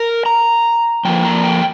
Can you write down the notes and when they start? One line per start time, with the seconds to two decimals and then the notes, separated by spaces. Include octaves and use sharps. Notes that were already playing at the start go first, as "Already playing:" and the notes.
Already playing: A#4
0.26 A#5
1.05 F2 F3 A#3 G5
1.25 A#5
1.43 G5